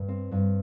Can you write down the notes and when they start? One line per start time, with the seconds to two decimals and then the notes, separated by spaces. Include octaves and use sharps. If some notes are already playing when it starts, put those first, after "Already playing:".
Already playing: G2
0.08 C4
0.31 G2